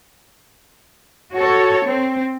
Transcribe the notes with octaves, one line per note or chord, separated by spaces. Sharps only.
F#4 A4 C#5
C4